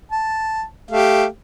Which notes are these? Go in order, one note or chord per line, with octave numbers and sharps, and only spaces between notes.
A5
A3 G4 F5